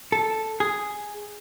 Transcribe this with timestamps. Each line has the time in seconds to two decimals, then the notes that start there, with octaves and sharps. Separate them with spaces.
0.12 A4
0.60 G#4